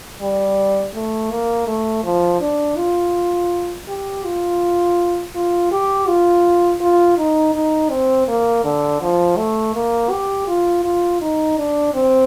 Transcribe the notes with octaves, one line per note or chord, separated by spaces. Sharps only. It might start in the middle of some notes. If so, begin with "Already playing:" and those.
G3
A3
A#3
A3
F3
D4
F4
G4
F4
F4
G4
F4
F4
D#4
D#4
C4
A#3
D3
F3
A3
A#3
G4
F4
F4
D#4
D4
C4